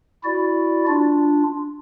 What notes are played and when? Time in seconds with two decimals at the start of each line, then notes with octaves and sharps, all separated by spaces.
0.24 E4 F#4 D5
0.87 D4 F4